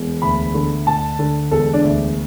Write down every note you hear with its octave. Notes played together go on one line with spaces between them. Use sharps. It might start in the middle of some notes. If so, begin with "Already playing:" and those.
Already playing: E1
D2 B5
D3
D2 A5
D3
E1 A4
D4
D2